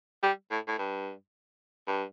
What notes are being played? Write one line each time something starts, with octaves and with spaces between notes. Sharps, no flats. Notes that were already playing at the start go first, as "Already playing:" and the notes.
G3
A2
A2
G2
G2